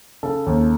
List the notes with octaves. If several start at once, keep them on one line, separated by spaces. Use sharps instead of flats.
C#3 A4
D#2